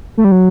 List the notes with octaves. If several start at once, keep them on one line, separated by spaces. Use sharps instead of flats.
A3
G3
F#3